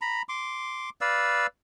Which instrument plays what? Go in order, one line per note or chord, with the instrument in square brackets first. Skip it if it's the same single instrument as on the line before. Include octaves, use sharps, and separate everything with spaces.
[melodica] A#5 B5
C6 D6
B4 D5 F5 E6